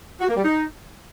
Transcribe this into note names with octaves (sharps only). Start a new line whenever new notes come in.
F#4
A#3
G3
D#4